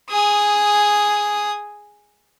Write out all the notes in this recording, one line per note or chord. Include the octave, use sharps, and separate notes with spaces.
G#4 D#6